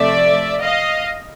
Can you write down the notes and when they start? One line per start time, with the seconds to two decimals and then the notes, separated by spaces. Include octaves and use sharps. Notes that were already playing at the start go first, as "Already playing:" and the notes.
Already playing: C3 F3 A3 D5 E5
0.62 D#5 F5